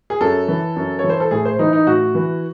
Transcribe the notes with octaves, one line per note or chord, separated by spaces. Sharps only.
G#4
F#2 A4
E3
F#2
C#5
E3
C5
A4
A2 G#4
C5
E3 D#4
D#4
A2 F#4
E3